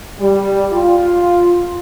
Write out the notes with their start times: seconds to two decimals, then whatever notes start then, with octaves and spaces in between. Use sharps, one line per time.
0.19 G3
0.72 F4